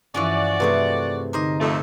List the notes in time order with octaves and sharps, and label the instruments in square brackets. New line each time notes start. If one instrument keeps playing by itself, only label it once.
[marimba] G2 [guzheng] E3 F3 C#4 [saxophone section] F#4 D5
[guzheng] C3 A3 G#4 [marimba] B4
[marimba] D3 D#4 D6 [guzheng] A#4 C5 D#5
[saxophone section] F2 A3